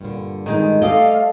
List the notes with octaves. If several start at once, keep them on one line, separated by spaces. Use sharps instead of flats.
G2 A#2 D3
D#3 G#3 D#4
A3 G4 A4 D5 D#5 F5